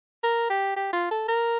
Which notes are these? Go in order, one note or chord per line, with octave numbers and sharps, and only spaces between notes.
A#4
G4
G4
F4
A4
A#4